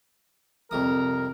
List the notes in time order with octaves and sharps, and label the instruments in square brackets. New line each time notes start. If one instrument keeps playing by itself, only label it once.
[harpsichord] C2 F2 D#6 [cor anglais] A#4